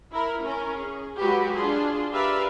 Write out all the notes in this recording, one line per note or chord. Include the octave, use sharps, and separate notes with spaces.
E4 A#4
C#4 A#4
G#4
F#3 G#3 F#4 G4 B4
D4 F4 G#4 C6
G4 A#4 B4 D5 E5 F5